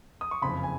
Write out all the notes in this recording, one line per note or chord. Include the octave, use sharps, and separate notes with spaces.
D#6
C#6
F#1 F2 C#3 B5
G#5